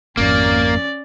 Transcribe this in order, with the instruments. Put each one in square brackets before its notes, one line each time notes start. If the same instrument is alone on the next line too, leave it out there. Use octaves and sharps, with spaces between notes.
[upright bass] G#1 F2 [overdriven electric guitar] A#3 [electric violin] C#4 D5